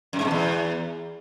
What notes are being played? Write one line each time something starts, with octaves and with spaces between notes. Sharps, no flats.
F#2
G#2
B2
E2